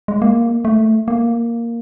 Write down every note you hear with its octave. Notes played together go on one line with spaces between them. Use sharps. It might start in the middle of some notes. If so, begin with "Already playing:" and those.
G#3
A#3
A3
A#3